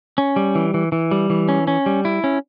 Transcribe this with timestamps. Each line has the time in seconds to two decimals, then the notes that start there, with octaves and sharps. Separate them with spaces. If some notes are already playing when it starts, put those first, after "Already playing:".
0.18 C#4
0.36 G3
0.55 E3
0.74 E3
0.92 E3
1.11 G3
1.30 E3
1.49 C#4
1.67 C#4
1.86 G3
2.05 E4
2.24 C#4